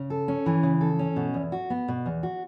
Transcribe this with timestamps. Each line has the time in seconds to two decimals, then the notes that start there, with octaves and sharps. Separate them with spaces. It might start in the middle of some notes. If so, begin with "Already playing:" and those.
Already playing: C#3
0.10 A4
0.28 C#4
0.46 E3
0.63 C#3
0.81 A4
0.99 C#4
1.16 B2
1.34 E2
1.52 F#4
1.70 B3
1.88 B2
2.06 E2
2.23 F#4